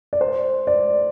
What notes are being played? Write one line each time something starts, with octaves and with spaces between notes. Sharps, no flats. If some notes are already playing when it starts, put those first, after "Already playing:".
D5
C5
D5